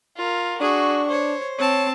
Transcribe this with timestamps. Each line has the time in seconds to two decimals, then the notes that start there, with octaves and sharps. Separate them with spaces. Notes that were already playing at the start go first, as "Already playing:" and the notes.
0.17 F4 A#4
0.61 D4 F#4 G#4 C#6
1.09 C5 C#5
1.58 C4 C#5 A5